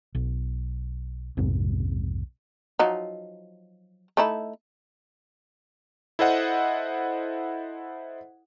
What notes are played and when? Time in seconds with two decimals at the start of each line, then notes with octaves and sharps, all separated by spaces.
0.15 B1
1.37 B1 F2 G#2 C3
2.79 F3 F#3 D#4
4.17 A3 D#4 E4
6.19 E4 A4 C5 D#5 F#5